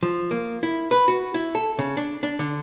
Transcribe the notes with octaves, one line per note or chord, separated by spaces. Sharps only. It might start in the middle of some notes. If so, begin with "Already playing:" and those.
F3
A#3
E4
B4
F#4
E4
A4
C#3
D4
D4
D3